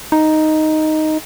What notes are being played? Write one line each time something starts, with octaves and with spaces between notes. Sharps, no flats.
D#4